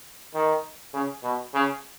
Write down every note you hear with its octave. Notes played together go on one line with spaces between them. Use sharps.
D#3
C#3
B2
C#3